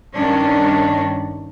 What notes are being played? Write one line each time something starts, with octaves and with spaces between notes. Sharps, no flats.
G2 D#3 C#4 D4